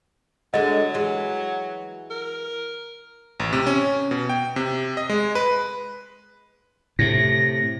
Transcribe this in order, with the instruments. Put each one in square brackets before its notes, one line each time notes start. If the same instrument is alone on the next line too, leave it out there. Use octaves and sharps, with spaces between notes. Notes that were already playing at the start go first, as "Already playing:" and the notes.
[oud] D3 G#3 A3 [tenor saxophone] F#3 [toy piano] D#5
[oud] E3 G#3
[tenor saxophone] A#4
[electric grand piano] A1
C3
C#4
B2
G5
C3
D#5
G#3
B4
[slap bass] A2 C3 [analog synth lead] A#6